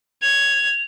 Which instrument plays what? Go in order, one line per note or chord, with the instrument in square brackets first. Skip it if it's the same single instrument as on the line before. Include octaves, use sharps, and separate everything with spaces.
[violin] G#6 [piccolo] F7